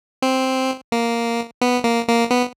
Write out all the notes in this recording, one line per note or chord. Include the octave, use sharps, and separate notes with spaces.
C4
A#3
B3
A#3
A#3
B3